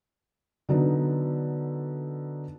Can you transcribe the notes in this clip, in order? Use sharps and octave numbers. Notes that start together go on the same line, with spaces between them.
D3 F#3 B3 D#4